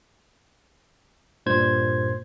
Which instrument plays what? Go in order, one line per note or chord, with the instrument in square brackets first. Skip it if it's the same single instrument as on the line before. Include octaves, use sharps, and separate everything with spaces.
[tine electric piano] G2 A#2 C5 G#6